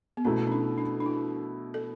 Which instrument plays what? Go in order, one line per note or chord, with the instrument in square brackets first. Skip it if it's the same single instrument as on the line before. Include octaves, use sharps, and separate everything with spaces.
[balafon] B3
[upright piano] B2 A3 E4 [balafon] C#4
[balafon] C#4
D4
D4
D4
E4
A4